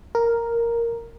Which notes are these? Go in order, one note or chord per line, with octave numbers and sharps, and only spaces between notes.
A#4